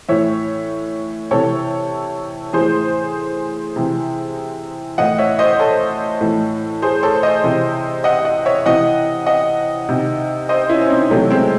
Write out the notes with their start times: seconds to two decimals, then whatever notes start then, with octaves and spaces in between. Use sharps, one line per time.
0.09 A2 E3 C#5 E5
1.31 C3 E3 A4 C#5
2.53 A2 E3 G#4 C5
3.76 C3 E3
4.98 A2 E3 D#5 F#5
5.18 C#5 E5
5.39 C5 D#5
5.60 A4 C#5
6.21 A2 E3
6.82 G#4 C5
7.03 A4 C#5
7.23 C5 D#5
7.44 C3 E3
8.04 D#5 F#5
8.25 D#5 F#5
8.45 C#5 E5
8.65 C3 E3 D#5 F#5
9.26 D#5 F#5
9.89 C3 D#3
10.49 C5 D#5
10.69 C#4 E4
10.81 C#4
10.90 C4 D#4
11.10 C3 E3 F#3 A3
11.30 G#3 C4